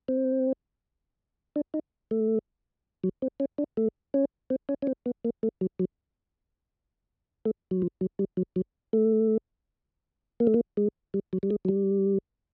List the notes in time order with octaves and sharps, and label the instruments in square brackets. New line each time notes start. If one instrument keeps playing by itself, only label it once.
[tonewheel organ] C4
D4
D#4
A3
F#3
C4
C#4
D4
A3
C#4
C4
C#4
C#4
C4
B3
A#3
A3
F#3
F#3
A3
F#3
F3
F#3
G3
F#3
F#3
A3
A#3
A3
A#3
G#3
G3
F#3
G3
G#3
F#3
G3